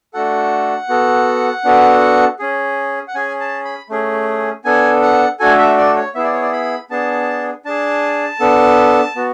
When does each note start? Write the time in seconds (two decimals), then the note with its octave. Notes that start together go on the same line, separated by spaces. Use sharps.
0.14 A3 D4 F#4 A4 F#5
0.89 B3 F#4 A4
1.65 B3 D4 F#4 A4
2.39 C#4 G#4
3.08 F#5
3.15 C#4 G#4 G#5
3.40 A5
3.65 B5
3.89 A3 C#4 G#4
4.65 B3 D4 A4 G#5
5.02 F#5
5.40 A3 D4 F#4 A4 G#5
5.58 E5
5.78 D5
5.96 C#5
6.15 B3 E4 G#4 E5
6.24 D5
6.32 C#5
6.42 D5
6.53 B5
6.90 B3 D4 G#4 A5
7.65 D4 G#4 A5
8.40 B3 D4 A4
9.15 B3 F#4